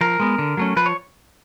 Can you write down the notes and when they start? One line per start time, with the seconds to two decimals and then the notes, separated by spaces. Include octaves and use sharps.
0.01 F3 A#4
0.20 G#3 B3
0.38 D3
0.57 F#3 A3 C#4
0.76 F3 B4
0.86 C#5